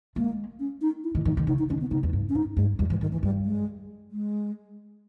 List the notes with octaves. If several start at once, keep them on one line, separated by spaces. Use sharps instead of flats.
G#3 A#3
C#4
D#4
E4
D#3
E3 D#4
D#3
C#3 D#4
D#4
D#3 C#4
B3
C#3 D#4
E2
G2
C#4
G#2 D#4
G2 G#3
E2 G3
G#2 E3
G2 D#3
E2 E3
G2 G3
G#3
G#3